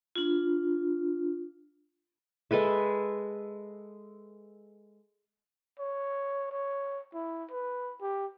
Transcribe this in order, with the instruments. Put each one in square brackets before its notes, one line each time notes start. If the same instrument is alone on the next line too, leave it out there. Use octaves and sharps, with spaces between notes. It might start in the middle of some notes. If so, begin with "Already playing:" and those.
[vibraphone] D4 F4
[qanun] G#3 A4 B4 E5
[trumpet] C#5
C#5
E4
B4
G4